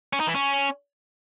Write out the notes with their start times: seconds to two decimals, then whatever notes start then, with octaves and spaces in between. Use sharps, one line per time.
0.13 C#4
0.20 D#4
0.27 E3
0.35 C#4